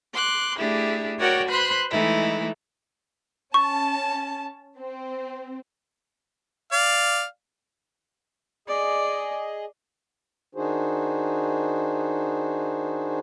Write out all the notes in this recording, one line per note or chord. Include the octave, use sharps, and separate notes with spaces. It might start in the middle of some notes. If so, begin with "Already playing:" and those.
C6 D6 F#6
A3 D4 E4 G4 G#4
F#4 A#4 C#5 D5 F#5 G5
B4 C5 B5 C6 F#6
E3 G#3 A3 D#4 E4
C#4 A5 C#6
C4
D5 F5
G#4 D5 D#5
D#3 D4 D#4 F#4 G#4 C5